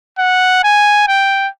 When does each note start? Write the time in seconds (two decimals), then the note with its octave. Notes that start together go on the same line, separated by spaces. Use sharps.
0.18 F#5
0.64 G#5
1.08 G5